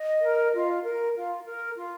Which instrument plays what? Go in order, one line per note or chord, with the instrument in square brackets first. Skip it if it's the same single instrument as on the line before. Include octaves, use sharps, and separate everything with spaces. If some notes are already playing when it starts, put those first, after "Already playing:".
Already playing: [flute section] D#5
A#4
F4
A#4
F4
A#4
F4